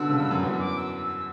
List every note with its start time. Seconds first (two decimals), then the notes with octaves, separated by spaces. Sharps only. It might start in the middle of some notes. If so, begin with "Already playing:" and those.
Already playing: B2 D3 E6
0.09 C#3
0.20 G2
0.31 F#2
0.43 E2 E6
0.53 F#2
0.59 D6
0.77 E6